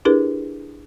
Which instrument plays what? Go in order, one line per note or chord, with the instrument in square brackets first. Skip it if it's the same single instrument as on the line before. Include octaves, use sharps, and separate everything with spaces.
[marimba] D4 E4 G4 G#4 A#4 B4